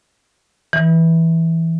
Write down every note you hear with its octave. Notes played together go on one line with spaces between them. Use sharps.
E3